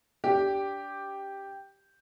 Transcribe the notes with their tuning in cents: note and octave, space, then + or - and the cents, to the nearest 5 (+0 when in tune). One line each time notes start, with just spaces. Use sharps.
D4 -25 G4 +0